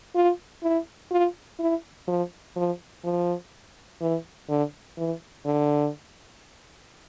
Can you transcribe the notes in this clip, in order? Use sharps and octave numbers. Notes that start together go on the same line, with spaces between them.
F4
E4
F4
E4
F3
F3
F3
E3
D3
E3
D3